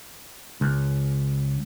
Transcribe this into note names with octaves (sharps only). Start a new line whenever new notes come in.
C#2